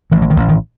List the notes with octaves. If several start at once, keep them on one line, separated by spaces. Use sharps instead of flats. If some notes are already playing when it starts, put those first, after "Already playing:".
A1 E3
E3
D#3
A1
D#3